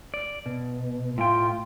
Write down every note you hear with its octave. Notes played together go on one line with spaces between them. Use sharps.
D5
B2
A2 F4 G5